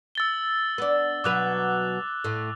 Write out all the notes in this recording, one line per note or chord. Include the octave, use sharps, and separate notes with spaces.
E6 A6 G7
B3 D4
B2 F#3 B4 D6 F#6 F7
A2 A3